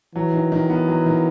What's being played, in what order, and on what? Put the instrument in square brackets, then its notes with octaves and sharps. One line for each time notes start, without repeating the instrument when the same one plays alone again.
[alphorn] E3 [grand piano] F#3
[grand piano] D#3
D#3
B3
F#3
D#3